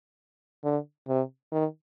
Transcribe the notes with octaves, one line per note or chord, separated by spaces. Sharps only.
D3
C3
D#3